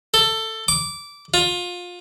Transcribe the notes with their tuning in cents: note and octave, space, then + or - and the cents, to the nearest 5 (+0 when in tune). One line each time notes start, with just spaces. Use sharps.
A4 +15
D6 -15
F4 +25